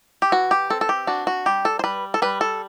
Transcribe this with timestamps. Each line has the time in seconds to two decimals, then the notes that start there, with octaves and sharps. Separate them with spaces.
0.22 G4
0.32 E3 F#4
0.51 G4
0.70 C4 A4
0.81 A4
0.89 G4
1.07 D4 F#4
1.27 F#4
1.46 G3 G4
1.65 A4
1.79 C5
1.84 G3 B4
2.14 A4
2.22 G3 B4
2.41 A4